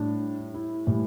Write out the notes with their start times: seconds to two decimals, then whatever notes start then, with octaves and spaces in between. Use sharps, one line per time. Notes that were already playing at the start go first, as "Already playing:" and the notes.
Already playing: A2 G3 D4
0.54 E4
0.87 A2 E3 G3